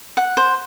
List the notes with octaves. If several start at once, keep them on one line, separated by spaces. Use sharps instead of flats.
F#5
C5